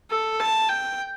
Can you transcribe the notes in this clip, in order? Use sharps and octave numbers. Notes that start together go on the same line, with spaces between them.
A4
A5
G5